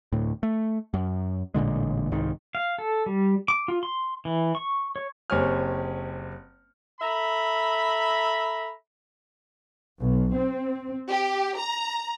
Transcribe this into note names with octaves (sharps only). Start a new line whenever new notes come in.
D2 A2
A3
F#2
A1 A#2 D3 G#3
C2 G#2 D#3
F5
A4
G3
D6
F4
C6
E3
C#6
C#5
F#1 C4 G4 C#5 G#5 F6
A4 E5 A#5 B5
B1
C4
G4
A#5